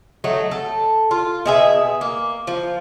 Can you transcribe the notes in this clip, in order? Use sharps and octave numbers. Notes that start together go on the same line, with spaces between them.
F#3 A3 D#4
A4
F4
B2 G#4 E5
A#3
F3